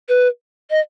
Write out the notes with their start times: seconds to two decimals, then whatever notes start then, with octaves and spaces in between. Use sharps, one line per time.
0.09 B4
0.70 D#5